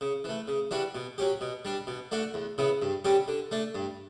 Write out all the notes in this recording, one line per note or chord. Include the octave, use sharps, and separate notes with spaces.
C#3
E3 A3
C#3
E3 G3 D4 F#4
B2
F#3 C#4 G4
B2
G3 D4
B2
A3 D4 F#4
E2
C#3 E3 B3
G2
D3 G3 C#4 G4
D3
A3 D4
G2